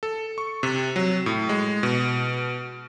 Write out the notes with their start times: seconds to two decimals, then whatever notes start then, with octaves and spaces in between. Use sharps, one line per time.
0.03 A4
0.38 C#6
0.63 C3
0.96 F#3
1.26 A2
1.49 G#3
1.83 B2